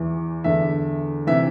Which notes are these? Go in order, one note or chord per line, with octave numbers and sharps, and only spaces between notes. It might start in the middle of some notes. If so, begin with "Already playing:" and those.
Already playing: E2 E3
E2 D3 E5
C3 E3 E5